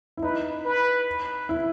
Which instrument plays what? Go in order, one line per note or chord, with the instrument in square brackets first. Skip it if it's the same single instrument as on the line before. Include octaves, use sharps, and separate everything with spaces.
[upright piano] E4
[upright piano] D#4 [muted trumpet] B4
[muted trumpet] B4
[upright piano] E4